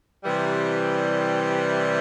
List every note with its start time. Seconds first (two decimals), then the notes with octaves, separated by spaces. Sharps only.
0.24 C3 E3 G3